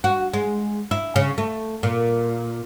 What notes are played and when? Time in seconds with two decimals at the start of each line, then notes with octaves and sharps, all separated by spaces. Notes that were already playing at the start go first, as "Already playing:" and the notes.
0.04 F#4
0.34 G#3
0.91 E4
1.16 C#3
1.38 A3
1.83 A#2